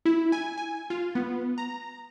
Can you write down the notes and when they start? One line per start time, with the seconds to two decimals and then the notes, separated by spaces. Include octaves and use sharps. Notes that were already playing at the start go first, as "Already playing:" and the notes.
0.05 E4
0.32 G#5
0.58 G#5
0.90 F4
1.15 B3
1.58 A#5